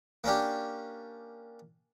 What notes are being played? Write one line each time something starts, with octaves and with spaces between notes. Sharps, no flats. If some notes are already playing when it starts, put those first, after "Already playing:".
A#3 C#4 D4 G4